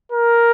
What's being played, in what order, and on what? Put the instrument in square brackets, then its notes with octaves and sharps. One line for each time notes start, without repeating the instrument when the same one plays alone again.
[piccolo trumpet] A#4